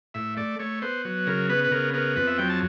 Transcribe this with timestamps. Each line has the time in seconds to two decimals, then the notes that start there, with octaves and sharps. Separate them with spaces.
0.14 A2 E5
0.37 A3 D5
0.59 A3 C#5
0.82 B3 C5
1.05 F#3
1.27 C#3 A#4
1.49 B3 B4
1.64 B4
1.71 C#3 A#4
1.94 B3 A#4
2.16 F2 B4
2.27 E5
2.38 F#3 G5
2.50 A5